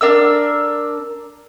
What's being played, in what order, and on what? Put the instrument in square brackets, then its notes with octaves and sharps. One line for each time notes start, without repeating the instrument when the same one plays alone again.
[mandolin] D4 A#4 E6